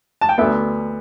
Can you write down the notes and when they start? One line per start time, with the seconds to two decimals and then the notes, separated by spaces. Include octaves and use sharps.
0.21 A5
0.29 G5
0.38 D2 D3 B3 E5